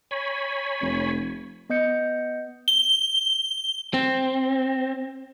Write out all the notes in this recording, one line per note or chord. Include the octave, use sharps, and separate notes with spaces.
C#5 G#5 B5
F1
B3 D#5 G6 C#7
G7
C4